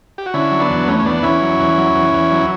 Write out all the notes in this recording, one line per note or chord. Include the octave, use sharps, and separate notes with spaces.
G4
F#4
D3 C#4 E4
F#3
B3 D4
E2
E2 A3 C#4
C#4
E2 B3 D4
E2 C#4 E4
F#3
E2
F#3
E2
E2
F#3